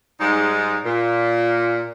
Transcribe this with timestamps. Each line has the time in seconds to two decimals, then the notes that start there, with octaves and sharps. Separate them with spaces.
0.19 G#2 G3 G#3 D#4
0.85 A#2